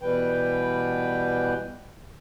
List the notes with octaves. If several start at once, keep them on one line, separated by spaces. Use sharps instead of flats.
B2 E3 G3 B4 G5